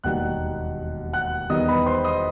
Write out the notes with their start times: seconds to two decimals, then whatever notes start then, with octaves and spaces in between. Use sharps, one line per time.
0.04 E1 D#2 D#3 G3 F#5 F#6
1.13 F#5 F#6
1.50 E2 D#3 G3 B3 D#5 D#6
1.68 B4 B5
1.86 C5 C6
2.05 D#5 D#6